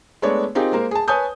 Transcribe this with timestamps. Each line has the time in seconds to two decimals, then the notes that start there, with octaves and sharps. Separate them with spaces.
0.22 G#3 A3 B3 D4 C#5
0.55 C4 D#4 F4 G4 G#4 A#4
0.72 G#3 A#3 A#4 C5
0.91 G#4 A5
1.08 B4 C#5 G#5 A5 D#6 G6